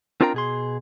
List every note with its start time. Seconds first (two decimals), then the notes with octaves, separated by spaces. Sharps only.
0.21 C4 D4 F4 A#4 G5 A#5
0.34 B2 G#4 C6